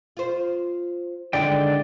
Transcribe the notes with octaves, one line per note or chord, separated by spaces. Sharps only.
F4 C5
D3 D#3 G#3 E4 D5 G5